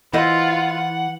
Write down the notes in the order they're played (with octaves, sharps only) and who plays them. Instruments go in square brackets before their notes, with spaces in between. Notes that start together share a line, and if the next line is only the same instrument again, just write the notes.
[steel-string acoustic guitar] E3 [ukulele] E4 C5 D#5 [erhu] F4 [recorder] F#5